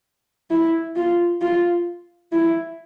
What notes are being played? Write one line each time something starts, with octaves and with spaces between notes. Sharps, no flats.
E4
F4
F4
E4